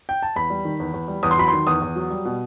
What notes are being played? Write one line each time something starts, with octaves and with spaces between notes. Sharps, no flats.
G5
A5
E2 B5
G3
D#3
E2
E2
G3
E2 D#6
C6
F#3 B5
D#3 C6
E2 D#6
E2
F#3
G3
B2